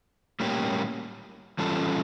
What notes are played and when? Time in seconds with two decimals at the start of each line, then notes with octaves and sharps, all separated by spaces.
0.40 A2 G3 A#3 C#4 G4
1.59 E3 G3 C#4 F4 A4